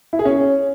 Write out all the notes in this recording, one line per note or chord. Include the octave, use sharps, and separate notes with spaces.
E4
G#4
C#4